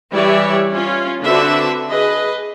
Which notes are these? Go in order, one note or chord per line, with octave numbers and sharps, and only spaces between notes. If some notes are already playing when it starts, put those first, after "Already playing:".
E3 G3 G4 C#5 D5 E5
C#4 F4
D3 C4 D4 F#4 B4 E5
G#4 B4 D#5